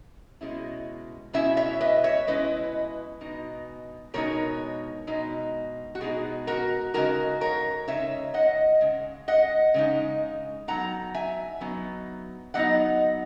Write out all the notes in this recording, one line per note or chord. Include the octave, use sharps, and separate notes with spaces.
B2 G#3 C#4 E4
B2 G#3 C#4 E4 E5 G#5
C#5 E5
B4 D#5
C#5 E5
B2 G#3 C#4 E4 B4 D#5
B2 G#3 D#4
B2 G#3 D#4 A#4 C#5
B2 G#3 D#4
F#4
B2 G#3 D#4 G#4
F#4 A#4
C#3 G#3 D#4 F#4 A#4
A#4 C#5
C#3 G#3 D#4 C#5 E5
D#5 F#5
C#3 G#3
D#5 F#5
C#3 G#3 D#4
F#3 B3 D#4 F#5 A#5
E5 G#5
F#3 B3 D#4
F#3 B3 D#4 D#5 F#5